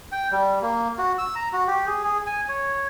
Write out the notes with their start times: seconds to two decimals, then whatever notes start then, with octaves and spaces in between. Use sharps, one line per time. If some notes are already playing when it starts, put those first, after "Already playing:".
0.12 G5
0.32 G3
0.62 A#3
0.98 F#4
1.18 E6
1.35 A#5
1.53 F#4
1.67 G4
1.87 G#4
2.04 G#4
2.26 G#5
2.49 C#5